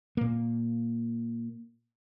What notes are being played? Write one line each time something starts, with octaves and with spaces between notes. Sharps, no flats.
A#2 A#3